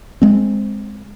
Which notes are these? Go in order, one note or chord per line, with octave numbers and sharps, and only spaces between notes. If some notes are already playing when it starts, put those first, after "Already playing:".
G#3 C4